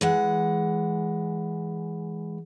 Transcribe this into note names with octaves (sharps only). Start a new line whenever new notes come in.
E3 G#3 F#5